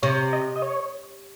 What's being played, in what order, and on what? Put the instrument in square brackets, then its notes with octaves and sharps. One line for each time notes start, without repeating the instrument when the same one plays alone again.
[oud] C3 [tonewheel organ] C#5
[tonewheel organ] D#5
D#5
C#5